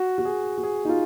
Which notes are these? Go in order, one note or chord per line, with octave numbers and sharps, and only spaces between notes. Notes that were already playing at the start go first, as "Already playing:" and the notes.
Already playing: F#4
F#4
G#4
F#4
G#4
D#4
F4